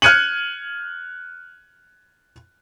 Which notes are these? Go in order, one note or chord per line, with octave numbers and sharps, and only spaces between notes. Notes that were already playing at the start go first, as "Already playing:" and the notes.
F6 F#6 G#6 C#7 D#7 F#7